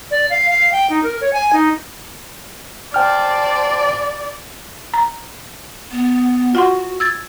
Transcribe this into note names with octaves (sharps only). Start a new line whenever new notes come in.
D5
F5
F5
G5
D#4
A#4
C#5
G#5
D#4
C5 D5 G5 A5 F6
A#5
B3
F4 F#4 F#5 C6
E6 G#6 A6